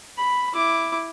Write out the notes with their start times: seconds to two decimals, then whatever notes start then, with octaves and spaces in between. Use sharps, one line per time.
0.18 B5
0.53 E4 D6